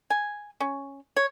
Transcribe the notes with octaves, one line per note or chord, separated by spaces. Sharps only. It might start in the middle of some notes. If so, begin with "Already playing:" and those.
G#5
C#4
C#5